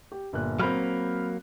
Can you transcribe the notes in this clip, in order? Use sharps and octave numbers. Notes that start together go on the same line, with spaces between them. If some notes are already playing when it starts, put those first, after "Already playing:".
G4
G1 A#2 F#6
F#3 A#3 C4 B5 F6